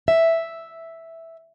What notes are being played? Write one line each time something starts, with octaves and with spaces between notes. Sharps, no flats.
E5